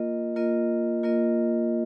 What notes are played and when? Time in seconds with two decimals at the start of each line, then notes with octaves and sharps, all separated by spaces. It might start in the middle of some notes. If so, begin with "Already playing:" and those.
Already playing: A#3 F4 A#4 D#5
0.36 A#3 F4 A#4 D#5
1.03 A#3 F4 A#4 D#5